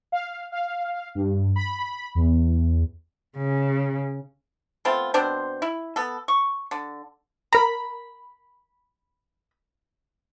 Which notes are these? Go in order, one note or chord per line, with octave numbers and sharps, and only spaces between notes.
F5
F5
G2
B5
E2
C#3
A3 B3 C4 F4
B2 C4 D4 C5
E4
B3 A4
C#6
D3
A#4 A#5 B5